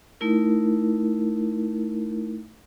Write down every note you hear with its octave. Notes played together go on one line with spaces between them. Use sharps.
A3 D#4 E4 A#4